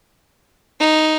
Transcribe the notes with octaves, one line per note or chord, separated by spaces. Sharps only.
D#4